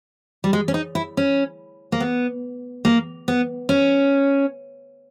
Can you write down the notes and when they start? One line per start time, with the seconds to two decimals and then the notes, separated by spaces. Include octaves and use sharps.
0.44 G3
0.53 G#3
0.68 C#4
0.74 D#4
0.95 E4
1.17 C#4
1.92 A#3
2.00 B3
2.85 A#3
3.28 B3
3.69 C#4